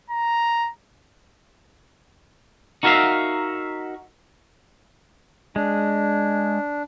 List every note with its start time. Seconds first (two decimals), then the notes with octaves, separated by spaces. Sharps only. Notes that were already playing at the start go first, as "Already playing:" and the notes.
0.10 A#5
2.83 D#4 F#4 A#4 C#5 E5 F5
5.56 G#3 D4